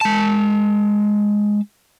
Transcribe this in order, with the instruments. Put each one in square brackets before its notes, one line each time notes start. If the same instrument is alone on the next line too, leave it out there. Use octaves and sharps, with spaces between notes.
[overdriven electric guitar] G#3 A5